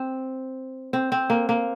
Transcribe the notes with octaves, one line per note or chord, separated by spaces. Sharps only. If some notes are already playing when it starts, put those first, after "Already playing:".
Already playing: C4
C4
C4
A#3
A#3